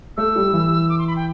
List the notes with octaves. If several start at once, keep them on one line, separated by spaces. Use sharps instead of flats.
A3 E6
G3
E3
D6
C6
B5
G5